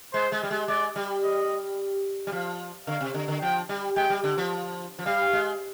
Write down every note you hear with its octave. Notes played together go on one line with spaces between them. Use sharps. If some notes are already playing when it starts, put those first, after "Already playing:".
G#3 C5
G#3
G3
G#3
G#3 D5
G3
D#5
G3
F3 F5
D3 F5
C3
D3
D3
F3 G5
G3
G#3 G5
G3
D3
F3
F3
G3 F5
G#3